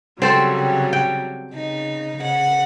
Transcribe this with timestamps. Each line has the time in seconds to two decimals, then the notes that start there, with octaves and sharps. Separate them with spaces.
0.22 C#3 F#3 G3 C4 A4 C5
0.93 G5
1.53 C#3 D#4
2.19 C#3 F#5